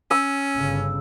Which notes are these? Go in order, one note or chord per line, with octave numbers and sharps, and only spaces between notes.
C#4 E6
G1 C#3